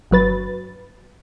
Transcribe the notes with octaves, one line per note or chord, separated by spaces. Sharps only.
G1 F#3 B4 A6